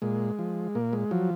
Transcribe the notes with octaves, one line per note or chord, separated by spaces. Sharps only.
A#2 G#3
F3
A#2 A#3
G#3
F3 F#3